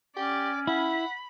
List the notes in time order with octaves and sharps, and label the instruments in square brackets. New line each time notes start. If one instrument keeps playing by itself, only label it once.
[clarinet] C#4 [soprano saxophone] G4 [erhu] D5
[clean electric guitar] E4 [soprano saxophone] F#5 [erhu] B5